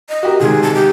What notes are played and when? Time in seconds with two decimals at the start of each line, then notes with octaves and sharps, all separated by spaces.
0.09 D#5
0.23 F#4 G4 A#4
0.40 G#2 C3 D#3 G#4
0.63 A5
0.75 G4